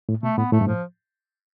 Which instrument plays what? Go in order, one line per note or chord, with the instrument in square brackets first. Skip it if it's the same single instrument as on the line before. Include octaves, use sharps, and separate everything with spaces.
[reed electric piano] A2
[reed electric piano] B2 [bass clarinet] A3
[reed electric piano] A2 [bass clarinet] B3
[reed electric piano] A2 [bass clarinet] A3
[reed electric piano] G2
[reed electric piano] A2 [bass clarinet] F3